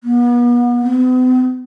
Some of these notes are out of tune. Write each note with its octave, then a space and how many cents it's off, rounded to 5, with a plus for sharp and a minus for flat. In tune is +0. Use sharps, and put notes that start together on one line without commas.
B3 -35
B3 +45